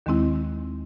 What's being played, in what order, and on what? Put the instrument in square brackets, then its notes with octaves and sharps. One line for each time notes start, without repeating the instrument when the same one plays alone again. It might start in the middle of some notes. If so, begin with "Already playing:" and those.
[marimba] D#2 D#3 G#3 C4 E4